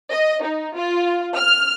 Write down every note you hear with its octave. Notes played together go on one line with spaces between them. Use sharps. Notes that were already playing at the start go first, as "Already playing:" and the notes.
D#5
D#4
F4
F6